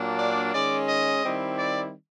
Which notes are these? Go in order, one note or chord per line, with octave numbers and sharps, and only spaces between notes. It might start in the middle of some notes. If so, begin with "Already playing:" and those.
Already playing: A#2 F#3 A#3 D4
D5
D#3 G#3 C#4 D5
D#5
D#3 G3 C4 E4
D5